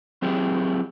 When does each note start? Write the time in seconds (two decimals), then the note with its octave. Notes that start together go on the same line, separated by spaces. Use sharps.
0.22 F#3 C4 E4 G4 G#4